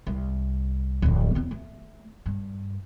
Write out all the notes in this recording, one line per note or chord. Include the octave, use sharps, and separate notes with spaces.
C2
D1 F2
E2 C4
A3
G2